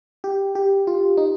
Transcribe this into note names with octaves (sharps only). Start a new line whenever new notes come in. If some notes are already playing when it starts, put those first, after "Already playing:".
G4
G4
F4
D#4